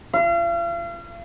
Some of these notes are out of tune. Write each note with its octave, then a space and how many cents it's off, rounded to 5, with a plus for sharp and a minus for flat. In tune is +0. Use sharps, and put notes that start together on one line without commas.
F5 -40